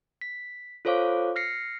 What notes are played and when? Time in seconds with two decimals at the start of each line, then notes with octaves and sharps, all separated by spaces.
0.21 B6
0.85 F4 A4 C5 C#5 F5 D6
1.36 F6 A#6 C7 C#7